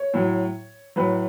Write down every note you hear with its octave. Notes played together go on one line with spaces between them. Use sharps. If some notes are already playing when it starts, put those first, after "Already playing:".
Already playing: C#5
A2 F#3
A2 F#3 B4